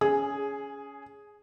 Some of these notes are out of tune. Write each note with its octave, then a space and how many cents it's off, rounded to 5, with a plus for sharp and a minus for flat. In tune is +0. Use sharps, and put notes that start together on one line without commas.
C#4 +20 G#4 +0